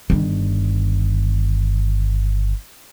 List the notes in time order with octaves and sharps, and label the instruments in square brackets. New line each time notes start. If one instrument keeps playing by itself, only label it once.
[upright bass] G1 D#3